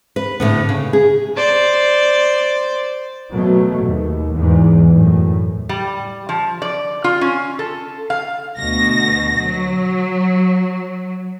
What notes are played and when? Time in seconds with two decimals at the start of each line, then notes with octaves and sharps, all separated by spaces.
0.16 B4
0.40 A2 D3 B3
0.69 C#3
0.93 G#4
1.36 C5 D5
3.32 B2 F#3 A3
3.83 D#2
4.35 E2 G#2
4.91 F#2 A2
5.69 G3
6.29 F3
6.62 D5
7.04 F4
7.21 C#4
7.59 A4
8.10 F5
8.58 D2 B2 A#6
9.40 F#3